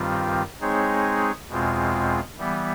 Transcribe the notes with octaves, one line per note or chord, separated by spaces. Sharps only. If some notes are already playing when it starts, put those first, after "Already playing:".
Already playing: G2 D#3 G3 C4 F4
G#3 C4 D#4 G#4 C#5
E2 B2 G#3 C4 F4
E3 G3 B3